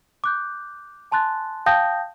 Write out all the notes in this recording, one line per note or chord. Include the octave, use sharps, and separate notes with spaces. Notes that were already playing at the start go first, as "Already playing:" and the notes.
D6 F#6 G6
G#5 A5 C6 F#6 A6
F5 G5 A5 D#6 G6 A#6